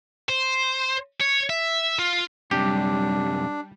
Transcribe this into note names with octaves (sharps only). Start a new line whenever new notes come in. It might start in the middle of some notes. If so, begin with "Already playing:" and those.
C5
C#5
E5
F4
F#2 C3 G3 D4 G4